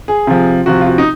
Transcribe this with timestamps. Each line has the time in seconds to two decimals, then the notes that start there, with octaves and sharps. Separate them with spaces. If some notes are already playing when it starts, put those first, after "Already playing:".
0.08 G#4
0.27 C3 F3
0.66 C3 F3 F#4
0.81 F4
0.87 F#4
0.98 D#4